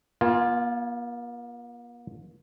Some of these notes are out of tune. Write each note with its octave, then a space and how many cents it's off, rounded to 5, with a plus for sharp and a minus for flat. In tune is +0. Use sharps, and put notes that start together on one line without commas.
A#3 +45 F4 +0 G#5 +0